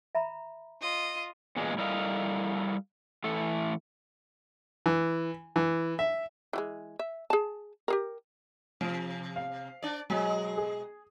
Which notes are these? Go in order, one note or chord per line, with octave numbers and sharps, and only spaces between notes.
E5 A#5 B5
F4 D#5
E2 A#2 G#3
G3 E4 A4 A#4 D#5 F5
E3 A3 A4
E3
E3
E5
E3 G3 G#3
E5
G#4 A5
G4 G#4 A#4
C3 F3
F5
D4 D5
B2 F#3 G#3
G#4